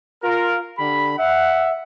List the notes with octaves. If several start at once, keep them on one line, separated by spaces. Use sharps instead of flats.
F4 A#4
D3 G4 B5
E5 F#5